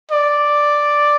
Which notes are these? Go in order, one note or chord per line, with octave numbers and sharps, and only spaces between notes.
D5